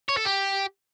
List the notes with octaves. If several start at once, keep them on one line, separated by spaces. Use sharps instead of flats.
C#5
A4
G4